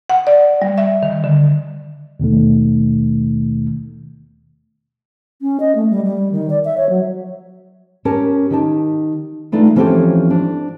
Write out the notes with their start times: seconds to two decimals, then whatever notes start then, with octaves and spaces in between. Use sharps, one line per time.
0.10 F#5
0.27 D5
0.62 G3
0.78 E5
1.03 D#3
1.24 D3
2.20 D#2 B2 D#3 A3
5.42 C#4
5.60 D#5
5.75 A3
5.90 G3
6.04 G3
6.32 D#3
6.50 D5
6.65 E5
6.78 C#5
6.89 F#3
8.05 C#4 G4 A#4 A5
8.50 D#3 G4 A5
9.52 E3 A3 D4 D#4 F4
9.76 E3 F3 C4 C#4 G4 A4
10.30 D4